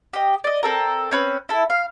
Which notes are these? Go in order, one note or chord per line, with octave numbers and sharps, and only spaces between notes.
G4 D#5
D5 D#5
C4 A4 A#4
C4 C#4 B4
E4 A4
F5